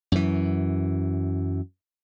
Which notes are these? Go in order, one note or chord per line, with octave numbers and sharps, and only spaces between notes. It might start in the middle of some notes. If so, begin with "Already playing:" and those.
F#2 E3